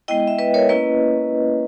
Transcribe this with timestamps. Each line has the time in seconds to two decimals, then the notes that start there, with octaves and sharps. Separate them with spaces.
0.08 G#3 B3 E4 D#5 G5
0.27 E5
0.39 B4 D#5
0.54 A#4 C#5
0.69 A#3 C#4 E4 B4 D#5